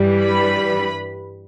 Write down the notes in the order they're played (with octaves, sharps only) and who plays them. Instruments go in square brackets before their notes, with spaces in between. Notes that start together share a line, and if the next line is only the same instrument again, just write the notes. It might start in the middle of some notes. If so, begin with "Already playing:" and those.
Already playing: [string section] G2 E3 G3
B4 B5